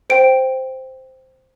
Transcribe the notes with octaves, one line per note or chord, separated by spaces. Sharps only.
C5 G5 D7